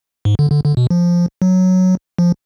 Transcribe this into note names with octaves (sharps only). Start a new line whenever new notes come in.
G#2
D3
D3
D3
B2
F3
F#3
F3